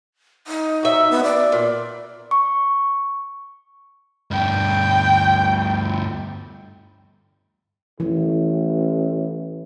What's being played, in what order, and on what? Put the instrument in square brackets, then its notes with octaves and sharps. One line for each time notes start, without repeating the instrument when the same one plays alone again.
[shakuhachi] D#4
[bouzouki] F#4 E5
[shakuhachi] B3
D5
[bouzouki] A#2
[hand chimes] C#6
[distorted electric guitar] D2 G2 [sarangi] G5
[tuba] A1 [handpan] E3